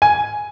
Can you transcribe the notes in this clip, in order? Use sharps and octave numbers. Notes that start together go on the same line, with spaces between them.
G#5